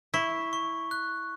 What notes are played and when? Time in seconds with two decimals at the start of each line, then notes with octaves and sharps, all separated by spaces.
0.14 E4 C#6
0.53 C#6
0.91 F#6